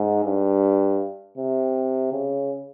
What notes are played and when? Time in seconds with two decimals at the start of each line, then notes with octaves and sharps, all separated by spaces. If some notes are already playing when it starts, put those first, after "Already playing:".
Already playing: G#2
0.25 G2
1.38 C3
2.12 C#3